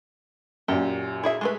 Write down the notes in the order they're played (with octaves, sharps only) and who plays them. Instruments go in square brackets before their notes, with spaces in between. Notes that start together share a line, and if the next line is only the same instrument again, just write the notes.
[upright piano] F#2 A#2 [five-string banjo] G4
[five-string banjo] E4 G#4 E5
G#3 A3 B4